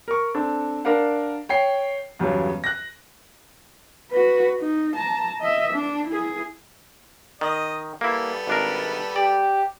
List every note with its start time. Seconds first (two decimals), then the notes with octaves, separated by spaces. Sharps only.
0.08 A#4 C#6
0.34 C4 D4 A4
0.85 D4 A#4 D5 F5 F#5
1.49 C#5 G5 C7
2.19 E2 G2 C#3 F#3
2.64 F#6 A#6
4.11 F#4 B4
4.60 D#4
4.96 A5 A#5
5.40 D#5 E5
5.73 D4
6.08 E4 G#4
7.41 D#3 D#5
8.01 G3 A#3 B3 E4 A4
8.47 G#1 D4 A#4
9.16 G4 D5